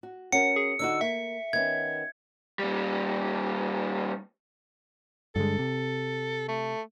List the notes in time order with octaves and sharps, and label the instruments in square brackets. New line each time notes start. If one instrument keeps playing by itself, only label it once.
[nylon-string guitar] F#4
[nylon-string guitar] C#4 F#4 A#4 [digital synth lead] F#5 [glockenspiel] C#7
[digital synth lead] G#4
[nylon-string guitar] D3 D#4 F#4 [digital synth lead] E6
[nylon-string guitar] A#3 [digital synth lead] E5
[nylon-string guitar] D#3 B3 C#4 [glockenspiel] G#6
[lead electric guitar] A#2 G3
[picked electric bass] G2 D3 G#3 [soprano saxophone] A4
[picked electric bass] C3
[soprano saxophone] A3